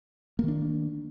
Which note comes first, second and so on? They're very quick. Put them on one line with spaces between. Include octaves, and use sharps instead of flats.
A#3 D#3 D4